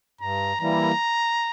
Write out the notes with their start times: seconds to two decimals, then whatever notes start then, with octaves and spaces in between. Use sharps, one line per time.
0.21 G2 A#5
0.60 E3 G3 A#3 E4 A#5